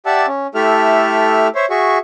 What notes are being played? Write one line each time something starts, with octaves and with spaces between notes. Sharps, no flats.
G4 D5 E5 F#5 A5 E6
C#4
A3 E4 G4 A4 E5 F6
C5 C#5 E5
F#4 G#4 E5 C#6